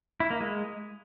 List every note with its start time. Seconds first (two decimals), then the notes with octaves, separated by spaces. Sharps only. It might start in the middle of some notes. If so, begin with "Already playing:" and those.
0.20 E4
0.30 A#3
0.41 G#3